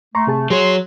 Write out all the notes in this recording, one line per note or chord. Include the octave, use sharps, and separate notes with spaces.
A3 A#5 C6 C#6
C3 G#4 A5
F#3 G#4 C#5 C6